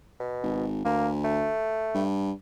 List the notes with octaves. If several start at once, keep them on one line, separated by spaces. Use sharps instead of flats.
B2
G#1
D2 A#3
A3
G2